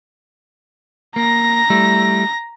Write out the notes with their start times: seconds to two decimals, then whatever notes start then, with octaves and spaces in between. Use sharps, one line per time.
1.16 A#3 A#5 A#6
1.70 G3 A3 E4